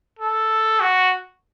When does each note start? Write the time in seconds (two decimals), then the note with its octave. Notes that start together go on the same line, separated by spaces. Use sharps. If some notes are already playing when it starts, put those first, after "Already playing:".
0.19 A4
0.80 F#4